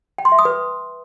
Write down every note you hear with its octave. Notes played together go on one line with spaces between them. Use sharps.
G5
C6
E5
D#6
B4